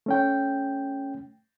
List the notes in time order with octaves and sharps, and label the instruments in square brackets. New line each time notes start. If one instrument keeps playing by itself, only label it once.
[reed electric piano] A3 C#4 G5